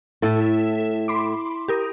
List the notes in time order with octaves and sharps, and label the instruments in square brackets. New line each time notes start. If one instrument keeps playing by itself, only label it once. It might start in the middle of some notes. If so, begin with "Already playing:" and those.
[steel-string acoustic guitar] A2 [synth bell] E4 A4
[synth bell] B5 C6 D6
G4 A#4 D#6